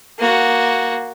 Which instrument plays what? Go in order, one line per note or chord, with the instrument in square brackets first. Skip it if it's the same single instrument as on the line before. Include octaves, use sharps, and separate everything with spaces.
[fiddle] A#3 F#4